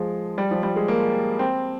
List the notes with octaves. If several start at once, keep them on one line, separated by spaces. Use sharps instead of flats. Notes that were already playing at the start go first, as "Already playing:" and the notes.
Already playing: F3 G#3
G3
F3
G3
G#3
A#3
C4